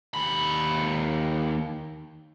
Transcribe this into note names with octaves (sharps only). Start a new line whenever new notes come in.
D#2 B5